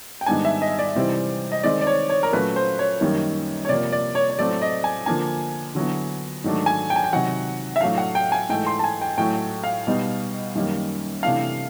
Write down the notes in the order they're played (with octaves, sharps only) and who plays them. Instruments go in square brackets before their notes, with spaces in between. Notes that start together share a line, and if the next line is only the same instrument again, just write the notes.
[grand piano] G5
G#2 D#3 G3 B3 D4 G#5
E5
D#5
D5
C3 E3 G3 C4 D#4
D#5
D#3 G#3 C4 D5
D5
C#5
C#5
A#4
A#2 F#3 A3 C#4 B4
C5
C#5
F#2 D#3 G3 A#3 D#4
C#5
C3 F3 A#3 D5
D5
C#5
C#5
A2 F#3 A3 C4 D5
D#5
G#5
D3 F3 A#3 D4 G#5
D3 F#3 B3 E4
G#2 D#3 F#3 A3 D4
G#5
G5
G#5
G5
C3 D#3 F#3 F#5
E5
A2 F#3 A3 D4 F5
F#5
G5
G#5
G#2 E3 A3 G5
C6
A5
G#5
G5
A2 F#3 A3 G5
F5
B2 G3 B3 D#4
F#2 D#3 G3 A#3
C3 E3 A3 D4 F5